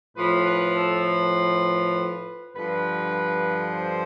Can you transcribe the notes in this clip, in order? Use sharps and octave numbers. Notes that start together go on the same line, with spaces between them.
A2 F3 B4
B4
A4
B4
B4
G2 D3 F3 B4
C5